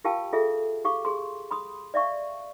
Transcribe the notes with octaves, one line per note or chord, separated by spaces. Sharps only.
F4 G4 A#4 F5 G5 A5
F4 G#4 A4 E5
G4 F5 C#6 D6
G#4 C6
B5 C6 D#6
D5 E5 F5 C#6